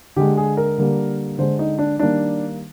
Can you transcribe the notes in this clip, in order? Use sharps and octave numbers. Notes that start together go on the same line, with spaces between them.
D3 G#3 G4
G#4
A#4
D3 G3 A#3
D3 G#3 C5
D#4
D4
D#3 G3 A#3 D4